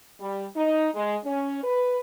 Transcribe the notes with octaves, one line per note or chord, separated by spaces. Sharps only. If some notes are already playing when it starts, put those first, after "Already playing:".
G3
D#4
G#3
C#4
B4